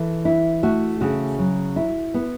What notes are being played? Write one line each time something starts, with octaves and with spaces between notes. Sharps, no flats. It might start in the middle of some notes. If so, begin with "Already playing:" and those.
Already playing: E3 A4
E4
A3 F#4
C#3 F#4
F#3
E4
B3